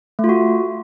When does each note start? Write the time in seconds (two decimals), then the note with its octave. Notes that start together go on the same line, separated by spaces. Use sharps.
0.19 A3
0.24 F4
0.29 F#4